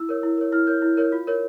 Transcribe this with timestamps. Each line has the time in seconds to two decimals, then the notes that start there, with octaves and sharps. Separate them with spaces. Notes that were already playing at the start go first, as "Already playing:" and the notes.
Already playing: E4 E6
0.09 A#4 C#5
0.23 E4
0.38 A#4 C#5
0.52 E4 F6
0.67 A#4 C#5 G6
0.82 E4
0.97 A#4 C#5
1.12 F4
1.27 A#4 C#5